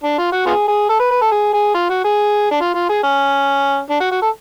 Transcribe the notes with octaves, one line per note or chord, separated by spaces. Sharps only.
D4
F4
F#4
B3 F4 G#4
G#4
A4
B4
B4
A4
G#4
G#4
F4
F#4
G#4
D4
F4
F4
G#4
C#4
D4
F#4
F#4
A4